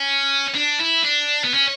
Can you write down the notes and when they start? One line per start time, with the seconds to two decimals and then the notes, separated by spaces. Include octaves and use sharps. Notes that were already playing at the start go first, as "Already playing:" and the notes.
Already playing: C#4
0.55 D4
0.79 E4
1.03 D4
1.44 B3
1.54 C#4